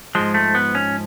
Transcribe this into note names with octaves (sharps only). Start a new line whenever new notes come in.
G#2 F3 G#3
A3
B3
C#4